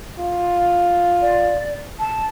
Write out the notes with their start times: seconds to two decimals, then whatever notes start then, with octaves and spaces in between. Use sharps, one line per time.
0.19 F4
1.22 D5
1.99 A5